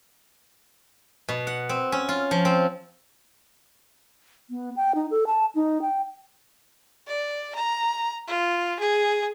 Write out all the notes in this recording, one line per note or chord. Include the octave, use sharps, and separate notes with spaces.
B2
F#5
C4
C#4
F4
F3
C4
B3
G5
D#4
A4
A5
D#4
G5
D5
A#5
F4
G#4